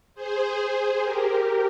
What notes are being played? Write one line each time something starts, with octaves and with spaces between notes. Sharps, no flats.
G#4 C5
G#4 C5
G4 A#4